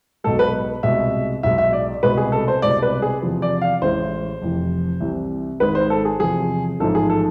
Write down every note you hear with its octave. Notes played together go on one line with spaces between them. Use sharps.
B1 B2 G#3 A4
B4
C2 B2 G#3 E5
B1 B2 G#3 E5
E5
D5
C2 B2 G#3 B4
G#4
A4
C5
C2 B2 G#3 D5
B4
G#4
E2 C3 F3
D5
F5
A1 A2 G#3 C5
F1 F2 E3
C2 C3 E3
G#1 G#2 G#3 B4
C5
A4
G#4
E2 C3 F3 G#4
A1 G#2 F3 G#3 A4
G#4
A4